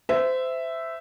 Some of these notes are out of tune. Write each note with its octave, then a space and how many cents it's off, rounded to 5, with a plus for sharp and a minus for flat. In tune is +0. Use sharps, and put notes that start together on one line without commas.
C5 -25 E5 +0